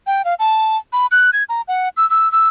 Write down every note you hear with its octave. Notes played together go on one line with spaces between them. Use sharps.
G5
F5
A5
B5
F#6
G#6
A#5
F#5
E6
E6
E6